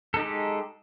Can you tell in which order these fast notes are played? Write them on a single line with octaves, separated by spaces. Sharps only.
A4 D#4 G4 G#3